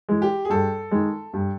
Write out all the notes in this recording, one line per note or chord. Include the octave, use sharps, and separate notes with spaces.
E3 G#3
G4
G#4
G2 A4
D#3 G#3
G2